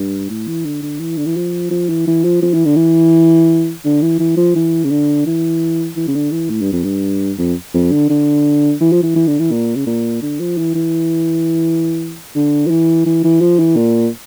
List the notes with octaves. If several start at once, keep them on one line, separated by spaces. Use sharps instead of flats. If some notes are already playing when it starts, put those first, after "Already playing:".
Already playing: G2
A2
E3
D3
D3
E3
D3
E3
F3
F3
E3
E3
F3
F3
E3
D3
E3
D3
E3
E3
F3
E3
C#3
D3
E3
E3
C#3
D3
E3
A2
G2
F2
G2
F2
F2
D3
D3
E3
F3
E3
E3
D3
E3
A#2
C#3
A#2
D3
F3
E3
E3
D3
F3
E3
E3
E3
F3
E3
A#2